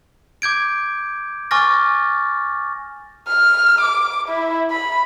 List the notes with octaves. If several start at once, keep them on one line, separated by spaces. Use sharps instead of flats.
D6 G6 G#6 D7
G#5 C#6 D6 F6 A6 A#6
F6
D6
E4
B5